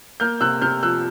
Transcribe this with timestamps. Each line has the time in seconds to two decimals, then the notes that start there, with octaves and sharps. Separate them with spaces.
0.20 A#3 F6 G6
0.41 C3 E6 F#6
0.61 C3 F6 G6
0.83 F3 E6 F#6